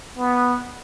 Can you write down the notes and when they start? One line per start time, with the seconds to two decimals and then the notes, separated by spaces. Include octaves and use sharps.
0.17 B3